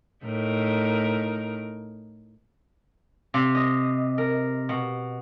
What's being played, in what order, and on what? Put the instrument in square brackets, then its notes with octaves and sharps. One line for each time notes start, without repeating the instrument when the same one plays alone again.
[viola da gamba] A2 D#4 A#4
[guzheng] C3
D#5
A#4
B2